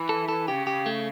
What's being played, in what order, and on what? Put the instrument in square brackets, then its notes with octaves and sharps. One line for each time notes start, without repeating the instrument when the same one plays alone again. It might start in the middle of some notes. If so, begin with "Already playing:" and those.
Already playing: [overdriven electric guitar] E3
[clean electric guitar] A4
A4
[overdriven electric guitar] C#3 [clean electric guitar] G4
[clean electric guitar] G4
A3